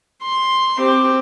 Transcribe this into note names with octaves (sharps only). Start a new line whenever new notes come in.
C6
C4 G4